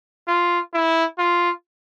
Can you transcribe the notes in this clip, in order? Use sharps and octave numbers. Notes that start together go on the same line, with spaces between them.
F4
E4
F4